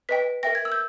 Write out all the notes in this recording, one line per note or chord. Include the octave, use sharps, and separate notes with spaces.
B4 D#5 G5 B6
A#4 E5 G5 A#6
G#6
E6
G6